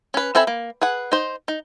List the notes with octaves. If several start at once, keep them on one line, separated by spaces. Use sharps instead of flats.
C#4 B4
C4 A4 E5 G#5 B5
A#3
G#4 B4 F#5
D#4 C5
D#4